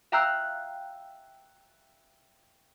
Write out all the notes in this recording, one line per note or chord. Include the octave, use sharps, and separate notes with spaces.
E5 F5 G5 A#5 E6 F#6